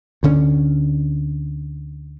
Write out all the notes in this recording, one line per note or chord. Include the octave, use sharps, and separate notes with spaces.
D2 D3 C#4